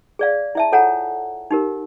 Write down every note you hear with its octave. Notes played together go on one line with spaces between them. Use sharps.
G#4 D5 F5
E4 E5 A5
F4 A4 C#5 F#5 G#5 A#5
D#4 G4 A#4